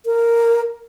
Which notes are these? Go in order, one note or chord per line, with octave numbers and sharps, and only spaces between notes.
A#4